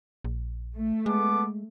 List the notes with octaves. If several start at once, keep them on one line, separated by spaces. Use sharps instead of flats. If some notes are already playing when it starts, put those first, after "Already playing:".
A#1
A3
G#3 B3 A4 D6